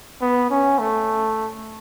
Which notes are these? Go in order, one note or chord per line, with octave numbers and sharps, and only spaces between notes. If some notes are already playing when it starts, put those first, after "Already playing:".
B3
C#4
A3